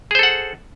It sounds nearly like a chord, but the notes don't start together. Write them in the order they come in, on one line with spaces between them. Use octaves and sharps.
G#4 C5 A4 F#5